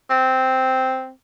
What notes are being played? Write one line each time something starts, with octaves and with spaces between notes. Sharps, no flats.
C4